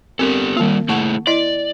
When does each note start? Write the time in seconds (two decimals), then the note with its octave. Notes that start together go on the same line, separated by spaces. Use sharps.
0.19 B3 C4 G4 A4 A#4
0.57 D#3 G3 A#3 F4
0.89 A3 E4 G#4 F#5 A5 C#6
1.27 E4 D5 D#5